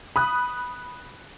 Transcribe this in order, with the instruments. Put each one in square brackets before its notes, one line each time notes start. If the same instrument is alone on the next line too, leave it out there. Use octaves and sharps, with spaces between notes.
[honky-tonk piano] B5 D#6 F#6